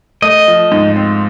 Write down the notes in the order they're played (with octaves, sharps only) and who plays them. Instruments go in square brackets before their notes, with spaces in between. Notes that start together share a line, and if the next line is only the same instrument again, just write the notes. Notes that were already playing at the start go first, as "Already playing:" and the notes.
[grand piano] A3 [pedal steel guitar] D#5
[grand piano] F3
G#2
C4